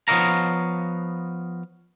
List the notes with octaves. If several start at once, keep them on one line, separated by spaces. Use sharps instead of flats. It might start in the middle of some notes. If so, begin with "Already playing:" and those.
F3 B3 C#5 D#5 F5 A#5